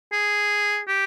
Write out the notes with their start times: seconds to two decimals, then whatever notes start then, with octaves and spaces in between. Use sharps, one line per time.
0.13 G#4
0.88 G4